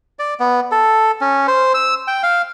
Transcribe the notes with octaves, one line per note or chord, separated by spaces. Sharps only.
D5
B3
A4
C#4
C5
E6
G5
F5